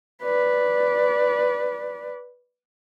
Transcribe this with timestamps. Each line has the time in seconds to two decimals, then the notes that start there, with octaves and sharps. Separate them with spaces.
0.22 B4 D5